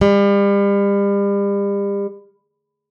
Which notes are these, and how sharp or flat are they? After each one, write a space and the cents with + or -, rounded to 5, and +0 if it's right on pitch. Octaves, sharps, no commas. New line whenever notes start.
G3 +35